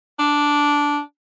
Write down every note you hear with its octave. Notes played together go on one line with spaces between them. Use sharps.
D4